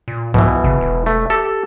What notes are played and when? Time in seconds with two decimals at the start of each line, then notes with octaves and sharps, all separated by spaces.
0.08 A#2
0.34 C2 G#2 B2 E3 F3
0.64 G1 C#3
0.81 E1
1.06 A3
1.30 G4 A4